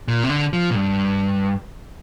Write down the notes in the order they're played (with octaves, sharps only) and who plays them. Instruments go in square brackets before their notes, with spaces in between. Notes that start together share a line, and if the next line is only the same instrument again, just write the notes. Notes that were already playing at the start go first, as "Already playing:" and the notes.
[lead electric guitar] A#2
C3
D3
F3
A#2
G2